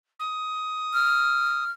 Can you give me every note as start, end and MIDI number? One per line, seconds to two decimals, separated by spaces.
0.19 1.64 87
0.93 1.71 89